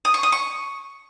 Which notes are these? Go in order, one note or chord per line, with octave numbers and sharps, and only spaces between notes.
D#6
C#6
D#6
C#6